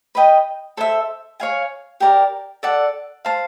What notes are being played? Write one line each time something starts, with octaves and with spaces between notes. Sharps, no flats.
B4 D#5 G5
A4 C5 E5
C#5 F5 G#5
G4 A#4 D5
A4 D5 F#5
C5 F5 A5